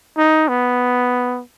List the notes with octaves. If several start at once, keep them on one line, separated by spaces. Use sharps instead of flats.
D#4
B3